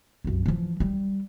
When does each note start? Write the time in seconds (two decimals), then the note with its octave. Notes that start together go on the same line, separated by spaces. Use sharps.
0.24 C2 F#2
0.46 E3 F3
0.80 G3